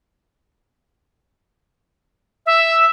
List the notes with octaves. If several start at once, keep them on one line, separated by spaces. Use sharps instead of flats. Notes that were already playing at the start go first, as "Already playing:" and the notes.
E5